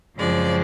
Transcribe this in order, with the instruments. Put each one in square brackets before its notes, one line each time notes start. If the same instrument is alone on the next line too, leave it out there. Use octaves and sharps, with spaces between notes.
[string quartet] F#2 C#3 F3 G#3 C4 D5